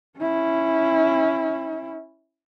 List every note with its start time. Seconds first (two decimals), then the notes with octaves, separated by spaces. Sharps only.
0.19 C#4 E4